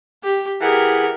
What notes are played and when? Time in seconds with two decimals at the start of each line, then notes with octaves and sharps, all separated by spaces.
0.23 G4
0.61 E3 G4 G#4 A#4 F#5